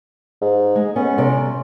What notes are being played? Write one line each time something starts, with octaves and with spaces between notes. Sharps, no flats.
G#2
G#3
B3 C#4
C3 G3 D5